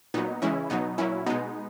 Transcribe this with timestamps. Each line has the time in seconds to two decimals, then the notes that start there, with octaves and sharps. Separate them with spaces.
0.14 A#2 F#3 B3 D#4
0.42 C#3 E3 G#3 C#4 E4
0.70 B2 F#3 B3 D#4
0.98 A#2 F#3 C#4 E4
1.26 B2 G#3 B3 D#4